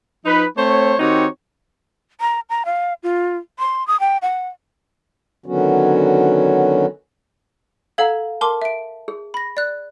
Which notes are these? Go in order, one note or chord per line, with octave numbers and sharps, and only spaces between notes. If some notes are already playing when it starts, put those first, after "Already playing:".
F3 D#4 B4
A3 C4 C5 C#5
D#3 C4 D#4 F#4 G4 C#5
A#5
A#5
F5
F4
C6
D#6
G5
F#5
D3 D#3 F#3 B3 C#4 F#4
A4 F5 F#5 A#5 G#6
A#4 A5 C6 D6
E5 D7
G#4
B5 A#6
D5 F#6